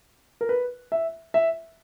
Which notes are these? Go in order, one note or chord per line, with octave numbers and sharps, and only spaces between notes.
A#4
B4
E5
E5